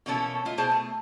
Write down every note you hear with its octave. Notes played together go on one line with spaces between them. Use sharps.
B2 E3 A#3 C#4 D4 A4
A3 F4 D#5
B2 E4 G#4 C5 A5
A3